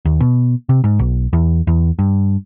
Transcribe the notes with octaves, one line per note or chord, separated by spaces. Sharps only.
D#2
B2
C3
G#2
B1
E2
E2
G2